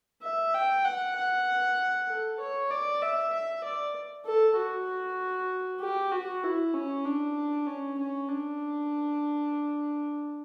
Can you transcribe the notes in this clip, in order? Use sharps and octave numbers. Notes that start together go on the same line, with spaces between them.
E5
G5
F#5
F#5
A4
C#5
D5
E5
E5
D5
A4
F#4
G4
F#4
E4
C#4
D4
C#4
C#4
D4